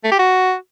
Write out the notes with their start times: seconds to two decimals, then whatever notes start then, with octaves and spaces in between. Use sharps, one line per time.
0.04 A3
0.12 G4
0.19 F#4